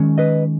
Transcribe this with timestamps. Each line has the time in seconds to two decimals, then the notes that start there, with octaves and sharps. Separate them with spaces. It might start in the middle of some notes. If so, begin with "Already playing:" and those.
Already playing: D#3 G#3 C#4
0.18 B4 D#5